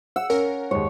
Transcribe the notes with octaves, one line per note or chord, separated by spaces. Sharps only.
F#5 E6
C#4 A#4
D#2 G#2 C#5